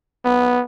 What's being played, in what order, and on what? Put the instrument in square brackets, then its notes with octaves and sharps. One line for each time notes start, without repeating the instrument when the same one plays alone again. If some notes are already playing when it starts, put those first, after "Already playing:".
[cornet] B3